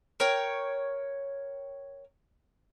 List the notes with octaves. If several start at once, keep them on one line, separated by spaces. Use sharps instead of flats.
A#4 C#5 G5